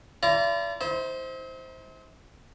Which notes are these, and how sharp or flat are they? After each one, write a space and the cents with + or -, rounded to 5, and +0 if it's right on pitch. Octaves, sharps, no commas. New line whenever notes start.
E4 +45 D5 -30 A#5 +0
E4 -45 C5 +0